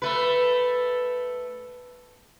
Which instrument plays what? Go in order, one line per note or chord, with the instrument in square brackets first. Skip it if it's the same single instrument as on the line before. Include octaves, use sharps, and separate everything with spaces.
[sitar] A3 B4